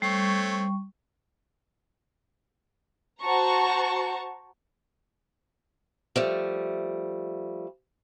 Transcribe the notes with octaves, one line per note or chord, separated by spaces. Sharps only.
G3 A3 C4 C#5 C#6
F#4 C5 A5 A#5 C#6
F3 G3 A3